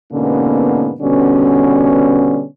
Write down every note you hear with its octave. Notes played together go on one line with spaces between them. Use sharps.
G#2 B2 D3 A#3 B3 C#4
B2 D3 G3 B3 C#4